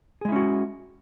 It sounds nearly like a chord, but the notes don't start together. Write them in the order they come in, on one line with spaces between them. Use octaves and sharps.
G#4 G#3 E4 C#4 F#4